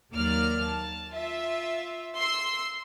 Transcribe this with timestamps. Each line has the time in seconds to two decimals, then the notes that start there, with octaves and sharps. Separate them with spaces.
0.14 D#2 F#3 A#3 D5 F6
0.64 A5
1.12 F4 E5
2.17 C6 E6 C7